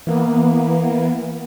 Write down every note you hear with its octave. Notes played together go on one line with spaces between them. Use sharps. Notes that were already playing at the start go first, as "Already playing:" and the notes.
E3 A#3 B3